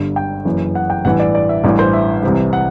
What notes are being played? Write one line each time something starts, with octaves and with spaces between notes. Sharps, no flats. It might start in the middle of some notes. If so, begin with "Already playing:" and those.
Already playing: G1 G2 D3
G5
F#1 F#2 E3
F#5
G5
A1 G2 E3 F#5
D5
D5
E5
A1 G2 E3 D5
C5
E5
C2 C3 E3
F#5